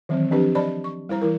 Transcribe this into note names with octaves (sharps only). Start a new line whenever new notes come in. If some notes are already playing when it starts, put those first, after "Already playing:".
D#3 E3 F#3 C4
F3 C4 D4 G4 B4
C5 D5 D#5 A5 B5
C#6
G3 E4 C5 A#5
E3 E4 A#4